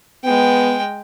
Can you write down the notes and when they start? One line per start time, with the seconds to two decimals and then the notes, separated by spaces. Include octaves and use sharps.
0.24 G#3 B3 G5